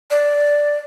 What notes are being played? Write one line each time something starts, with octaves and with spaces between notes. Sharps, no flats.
D5